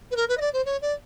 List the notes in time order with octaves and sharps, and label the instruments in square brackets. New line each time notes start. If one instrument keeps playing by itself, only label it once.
[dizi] B4
A#4
B4
D#5
D5
C5
C#5
D5